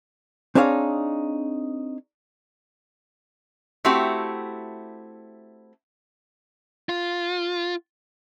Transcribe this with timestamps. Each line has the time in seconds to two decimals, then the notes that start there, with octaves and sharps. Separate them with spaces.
0.55 C4 D4 D#4 G#4 C#5 F5
3.85 A3 C4 E4 F#4 G4
6.89 F4